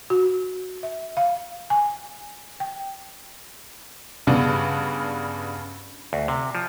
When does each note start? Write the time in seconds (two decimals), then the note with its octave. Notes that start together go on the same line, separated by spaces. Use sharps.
0.10 F#4
0.83 E5
1.17 F5
1.70 G#5
2.60 G5
4.27 G2 C#3 B3 D4
6.13 D2
6.28 C3
6.55 F3